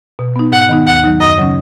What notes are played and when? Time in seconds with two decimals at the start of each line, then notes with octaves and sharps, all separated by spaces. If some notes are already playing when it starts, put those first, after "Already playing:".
0.19 B2
0.36 B3 D#4
0.52 G#2 F#5
0.69 D#3 B3 D#4
0.86 D#2 F#5
1.04 D#3 F#3 D#4
1.20 F#2 D#5
1.38 C#3 F#3 C#4